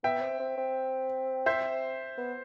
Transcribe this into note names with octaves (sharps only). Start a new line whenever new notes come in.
B3 E5 G5
C4
C4
C4
C5 E5
B3